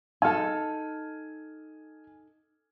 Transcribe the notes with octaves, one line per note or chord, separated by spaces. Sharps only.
D#4 A4 G#5 F6